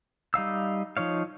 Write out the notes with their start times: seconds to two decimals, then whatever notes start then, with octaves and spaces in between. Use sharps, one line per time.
0.34 G3 D#4 F5 E6
0.97 F3 D#4 C#5 F5